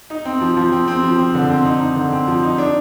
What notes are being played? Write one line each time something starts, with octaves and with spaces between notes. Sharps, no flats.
D#4
C4
F3
F3
C4
C4
F3
C4
D3
C4
D#4
D#4
D3
C4
F3
D#4
D4